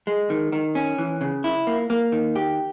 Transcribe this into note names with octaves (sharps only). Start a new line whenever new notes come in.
G#3
D#3
D#3
C#4
E3
C#3
E4
A#3
A#3
D#3
G4